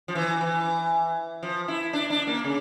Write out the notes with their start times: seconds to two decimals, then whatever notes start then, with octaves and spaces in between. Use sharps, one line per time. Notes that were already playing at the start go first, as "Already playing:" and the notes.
0.08 F3
0.15 E3
0.41 E3
1.43 F3
1.68 E4
1.93 D4
2.10 D4
2.27 A#3
2.44 C#3